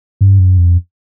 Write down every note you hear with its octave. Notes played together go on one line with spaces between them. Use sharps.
G2
F#2
F2